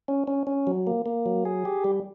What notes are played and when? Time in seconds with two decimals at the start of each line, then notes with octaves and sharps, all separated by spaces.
0.08 C#4
0.27 C#4
0.47 C#4
0.67 F#3
0.87 A#3
1.06 A#3
1.26 F#3
1.45 G#4
1.65 G4
1.84 G3